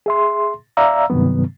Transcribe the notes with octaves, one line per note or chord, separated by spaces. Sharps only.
G#4 E5 C6
D5 E5 F5 A#5 E6
G2 C3 D#3 F#3 B3